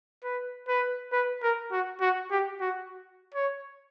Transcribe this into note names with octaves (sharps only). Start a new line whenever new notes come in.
B4
B4
B4
A#4
F#4
F#4
G4
F#4
C#5